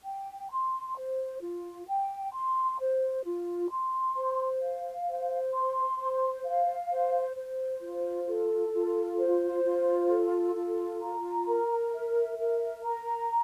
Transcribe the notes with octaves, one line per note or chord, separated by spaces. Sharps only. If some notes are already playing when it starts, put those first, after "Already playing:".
G5
C6
C5
F4
G5
C6
C5
F4
C6
C5
F5
C5
C6
C5
F5
C5
C5
F4
A4
F4
C5
F4
A4
F4
A#5
A#4
E5
A#4
A#5